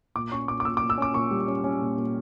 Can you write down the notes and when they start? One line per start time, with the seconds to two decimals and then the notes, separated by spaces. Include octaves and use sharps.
0.15 A#2 D6
0.31 C#4 C#6
0.48 A#2 D6
0.60 D6
0.65 A#2 E6
0.77 D6
0.82 A#2
0.90 E6
0.98 C#4 D6
1.14 A#2 C#6
1.31 G3
1.48 C#4
1.64 C#4
1.81 A#2
1.97 A#2